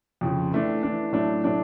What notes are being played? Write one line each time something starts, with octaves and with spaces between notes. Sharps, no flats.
F2 C#3 F3
E3 A3 D4
E3 A3 D4
A2 F#3 A3 D4
A2 F#3 A3 D4